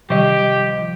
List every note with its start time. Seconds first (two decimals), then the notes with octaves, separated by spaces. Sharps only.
0.10 C3 D#3 F3 G3 G4 D#5